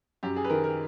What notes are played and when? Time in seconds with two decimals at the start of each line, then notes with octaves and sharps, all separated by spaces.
0.23 F#2 G4
0.36 G#4
0.45 B4
0.50 D#3 A#4
0.64 A#4